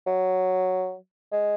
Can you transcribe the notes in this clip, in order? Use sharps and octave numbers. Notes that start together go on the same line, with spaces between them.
F#3
G#3